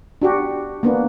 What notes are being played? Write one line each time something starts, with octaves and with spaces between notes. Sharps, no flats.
D4 F#4 G4
A#3 B3 D4